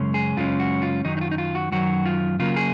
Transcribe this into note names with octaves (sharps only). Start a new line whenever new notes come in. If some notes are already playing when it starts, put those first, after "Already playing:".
Already playing: F#2 C#3 G#3 C#4
G#4
F#2 C#3 G#3 C#4 F4
F#4
F4
F#2 D#3 F#3 D#4
D#4
F4
D#4
F4
F#4
F#2 D#3 F#3 F#4
F4
C#3 F#3 A#3 F4
G#4